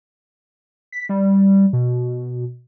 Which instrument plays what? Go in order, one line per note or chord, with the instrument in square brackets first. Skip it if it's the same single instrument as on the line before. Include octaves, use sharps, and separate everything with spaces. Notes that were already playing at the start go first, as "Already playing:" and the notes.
[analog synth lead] B6
G3
B2